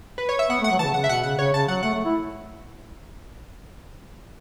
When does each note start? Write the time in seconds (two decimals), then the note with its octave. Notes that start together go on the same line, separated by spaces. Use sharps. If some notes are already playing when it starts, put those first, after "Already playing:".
0.18 B4
0.29 C#5
0.39 E5
0.49 B3 F#5
0.60 A3 F#5
0.71 F#3
0.79 C#3 E3 A5
0.94 C#3 F#5
1.04 E5
1.09 B2 F#5
1.23 C#3 F#5
1.38 C#3 C#5
1.54 C#3 A5
1.68 F#3 F#5
1.83 A3 F#5
1.94 A3
2.05 E4